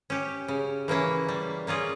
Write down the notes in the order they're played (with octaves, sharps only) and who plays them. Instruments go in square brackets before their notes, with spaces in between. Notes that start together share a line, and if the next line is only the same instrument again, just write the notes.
[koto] C#4 G4
C#3
E3 A#3 C#4 E4
G3
A#3 C#4 F4 G#4